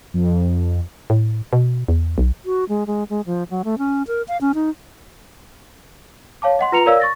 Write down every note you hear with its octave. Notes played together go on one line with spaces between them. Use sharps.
F2
A2
B2
E2
B1
F#4
G#3
G#3
G#3
F3
F#3
A3
C#4
A#4
F5
C#4
D#4
C#5 F5 A5 D6
D#5 F#5 C6
F4 B4 A#5 C#7 F7
A#4 C#5 D5 F5 E6
C#6 A6 A#6